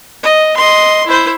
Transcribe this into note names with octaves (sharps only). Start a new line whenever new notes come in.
D#5
D#5 C6
E4 C5